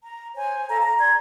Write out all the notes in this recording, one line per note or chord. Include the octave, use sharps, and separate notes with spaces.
A#5
C5 C#5 G#5
A4 F5 A5 A#5
A#5
D5 A#5 C6 G#6